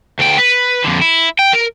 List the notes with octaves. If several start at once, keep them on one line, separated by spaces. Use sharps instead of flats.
D2 G5
B4
F2 D3
E4
G5
A#4